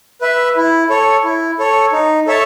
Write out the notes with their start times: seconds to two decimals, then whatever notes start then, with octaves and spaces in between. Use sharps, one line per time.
0.21 B4 E5
0.56 E4
0.90 A4 C#5
1.24 E4
1.59 A4 C#5
1.93 D#4
2.27 A4 C#5 E5 A5